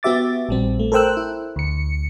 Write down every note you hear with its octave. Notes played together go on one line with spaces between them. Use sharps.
B3 F#4 G4 E5 D6 A6
A#1 G3 C4
A3
A4 A#4 C5 G5 E6 F#6
E4
D2 C#7